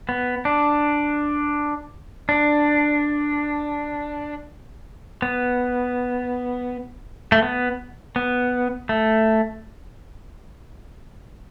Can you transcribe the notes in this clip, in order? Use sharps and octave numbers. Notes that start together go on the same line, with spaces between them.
B3
D4
D4
B3
A3
B3
B3
A3